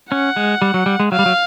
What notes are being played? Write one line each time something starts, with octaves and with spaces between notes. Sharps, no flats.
C#4 F#5
G#3
G3
F#3
G3
G#3
F#3 F5
G3
F#3